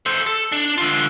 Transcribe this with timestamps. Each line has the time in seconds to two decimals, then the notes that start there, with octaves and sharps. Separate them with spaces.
0.06 A4 C5
0.26 A4
0.52 D4
0.78 D3 F4